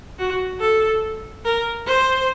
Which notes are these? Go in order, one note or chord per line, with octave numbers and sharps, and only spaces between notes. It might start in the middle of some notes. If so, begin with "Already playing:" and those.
F#4
A4
A#4
C5